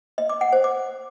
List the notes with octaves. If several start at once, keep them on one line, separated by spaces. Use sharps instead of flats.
D#5
D6
F#5
C5
D6